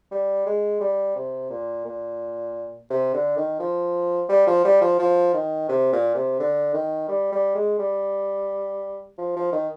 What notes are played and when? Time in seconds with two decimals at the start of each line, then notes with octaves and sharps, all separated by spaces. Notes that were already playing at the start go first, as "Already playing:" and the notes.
0.11 G3
0.46 G#3
0.80 G3
1.16 C3
1.50 A#2
1.85 A#2
2.90 C3
3.14 D3
3.37 D#3
3.59 F3
4.29 G3
4.47 F3
4.65 G3
4.81 F3
4.99 F3
5.33 D#3
5.69 C3
5.93 A#2
6.15 C3
6.39 D3
6.74 D#3
7.09 G3
7.32 G3
7.55 G#3
7.79 G3
9.18 F3
9.36 F3
9.52 D#3